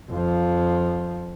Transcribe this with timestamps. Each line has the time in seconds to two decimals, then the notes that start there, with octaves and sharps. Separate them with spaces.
0.11 F2 F3